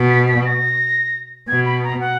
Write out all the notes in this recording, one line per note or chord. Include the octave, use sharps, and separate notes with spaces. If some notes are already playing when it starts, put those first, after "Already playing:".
Already playing: B2
B6
B6
A#6
B2 G#6
B5
A#5
F#5